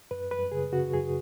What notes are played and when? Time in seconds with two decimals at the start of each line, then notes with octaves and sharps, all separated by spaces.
0.11 F#2 B4
0.31 F#2 B4
0.52 C#3 G#4
0.73 C#3 F#4
0.93 F#2 G#4